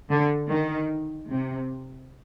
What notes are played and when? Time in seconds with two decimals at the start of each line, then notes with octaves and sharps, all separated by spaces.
0.10 D3
0.51 D#3
1.32 C3